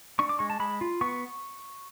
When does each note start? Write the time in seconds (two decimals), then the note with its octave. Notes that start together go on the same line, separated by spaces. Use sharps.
0.19 D4 C#6
0.29 D6
0.39 G#3 C#6
0.50 A5
0.60 G#3 B5
0.81 F4
1.01 B3 C#6